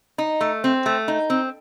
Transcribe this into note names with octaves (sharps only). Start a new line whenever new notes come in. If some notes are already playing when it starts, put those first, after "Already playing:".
D#4
A3
C4
A3
D#4
C4